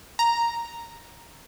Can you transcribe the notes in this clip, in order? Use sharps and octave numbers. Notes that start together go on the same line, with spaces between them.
A#5